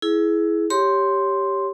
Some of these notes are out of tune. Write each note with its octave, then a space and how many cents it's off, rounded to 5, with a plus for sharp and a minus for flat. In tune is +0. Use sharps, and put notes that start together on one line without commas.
E4 +0 G#4 +20
G4 +0 C#5 +0 C6 +0